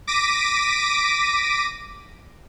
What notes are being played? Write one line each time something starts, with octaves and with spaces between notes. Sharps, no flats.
D6 A#6 B6 D7 D#7